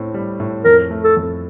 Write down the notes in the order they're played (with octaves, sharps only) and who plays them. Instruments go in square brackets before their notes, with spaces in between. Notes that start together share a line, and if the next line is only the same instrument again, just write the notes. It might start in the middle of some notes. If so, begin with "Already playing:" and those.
Already playing: [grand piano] A2 C4
G3
A2
[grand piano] F2 [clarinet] A#4
[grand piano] A3
[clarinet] A4
[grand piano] F2